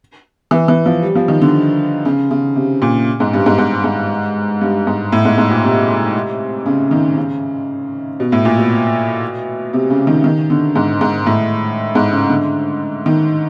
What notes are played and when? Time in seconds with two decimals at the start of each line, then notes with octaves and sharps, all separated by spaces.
0.51 E3
0.68 E3
0.86 F3
1.02 G3
1.15 F3
1.28 D#3
1.42 D3
2.05 C#3
2.31 C#3
2.56 C3
2.82 A#2
3.20 G#2
3.33 G2
3.46 G#2
3.58 G#2
3.84 G#2
4.61 G2
4.87 G#2
5.12 A2
5.25 G#2
5.38 G#2
5.50 A#2
5.64 C3
6.66 C#3
6.91 D#3
7.17 C#3
8.20 B2
8.32 A2
8.45 A#2
8.58 B2
9.73 C3
9.90 C#3
10.07 D#3
10.24 D#3
10.50 D3
10.75 G#2
11.01 G#2
11.26 A2
11.95 G#2
12.12 C#3
12.30 D3
13.06 D#3